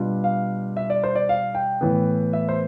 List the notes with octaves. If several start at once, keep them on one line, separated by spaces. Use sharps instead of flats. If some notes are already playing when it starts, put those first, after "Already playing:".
Already playing: B2 G3 D4 F4
F5
E5
D5
C5
D5
F5
G5
A2 E3 B3
E5
C5